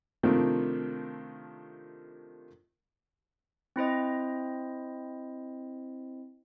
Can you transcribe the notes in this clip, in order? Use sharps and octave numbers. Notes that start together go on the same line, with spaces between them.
C3 D#3 F3 A3 C4 D4
C4 E4 C5 D#5